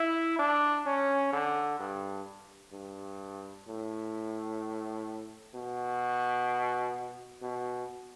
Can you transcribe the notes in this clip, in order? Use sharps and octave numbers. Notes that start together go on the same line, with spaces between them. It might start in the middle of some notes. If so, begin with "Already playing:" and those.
Already playing: E4
D4
C#4
D3
G2
G2
A2
B2
B2